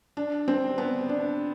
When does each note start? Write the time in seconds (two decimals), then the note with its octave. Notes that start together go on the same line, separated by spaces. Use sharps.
0.17 D4
0.48 C4
0.78 B3
1.09 D4